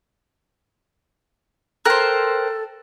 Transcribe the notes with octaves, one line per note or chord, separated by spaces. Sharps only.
A4 A#4 C5 G5 F6 F#6